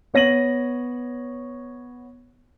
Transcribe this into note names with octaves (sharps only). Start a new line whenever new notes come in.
B3 C#5 A#6 D#7 F#7